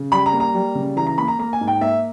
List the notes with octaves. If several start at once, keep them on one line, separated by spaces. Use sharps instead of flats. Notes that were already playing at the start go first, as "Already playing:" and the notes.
Already playing: C#3
G3 B5
A#5
A#3
A#5
G3
C#3
E3 A#5
A#5
A#3 B5
A#5
A#3 A#5
G#5
G#2
G5
A#3 E5